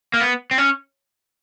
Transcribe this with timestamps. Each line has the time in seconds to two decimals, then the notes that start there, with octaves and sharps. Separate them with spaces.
0.14 A#3
0.21 B3
0.51 C4
0.58 C#4